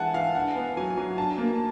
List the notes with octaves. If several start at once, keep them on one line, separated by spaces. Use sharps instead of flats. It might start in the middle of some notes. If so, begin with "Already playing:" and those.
Already playing: E3 G#3 F#5 G#5 A5
E3 F5
D4 F#5
B3
F#3 G#5
F#3
D4 A5
A#3